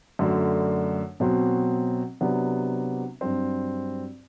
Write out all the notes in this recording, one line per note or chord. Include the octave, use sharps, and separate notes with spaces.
F#2 D3 A3 D4
B2 F#3 C4
C3 F#3 B3 D4
G2 F#3 C4